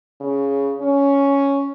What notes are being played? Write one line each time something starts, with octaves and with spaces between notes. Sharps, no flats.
C#3
C#4